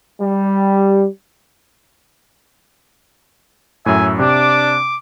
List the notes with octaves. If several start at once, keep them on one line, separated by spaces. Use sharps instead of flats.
G3
F#2 A2 E5 G#5
C3 D4 D6